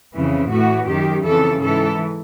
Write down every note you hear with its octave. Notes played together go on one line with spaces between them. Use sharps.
F2 C#3 E3
A2 E3 F#4
F#2 D#3 G4
F2 C#3 E3 A4
G#2 E3 A4